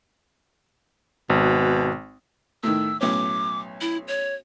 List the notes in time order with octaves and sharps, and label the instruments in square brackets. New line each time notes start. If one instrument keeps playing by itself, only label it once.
[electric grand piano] G#1 [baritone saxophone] B2
[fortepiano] A2 D#3 [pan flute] E6
[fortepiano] B1 A2 C#4 [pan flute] D6
[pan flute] E4
C#5